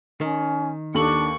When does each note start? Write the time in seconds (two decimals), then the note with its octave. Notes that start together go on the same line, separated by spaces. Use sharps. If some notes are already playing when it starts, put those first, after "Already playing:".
0.21 D#3 C#4
0.94 D#2 D4 A4 C#6 F#7